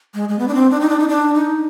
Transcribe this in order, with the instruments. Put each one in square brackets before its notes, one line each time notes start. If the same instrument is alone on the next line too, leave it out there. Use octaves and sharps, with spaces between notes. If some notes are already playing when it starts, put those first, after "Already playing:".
[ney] G#3
G#3
B3
D4
C4
D4
D#4
D4
D#4
D4
D#4